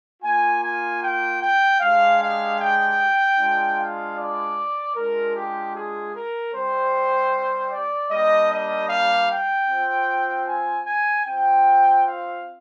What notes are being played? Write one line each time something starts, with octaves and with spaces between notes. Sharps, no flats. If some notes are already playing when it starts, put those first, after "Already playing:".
A#3 F4 G#5
G#5
G5
G5
G#3 D4 G4 F5
F5
G5
G#3 D4 F4
F5
D5
G#3 D4 F4 A#4
G4
G#4
A#4
G3 C4 G4 C5
D5
G3 A#3 D4 D#5
D#5
F5
G5
C4 F4
G#5
G#5
C4 F4 G5
F5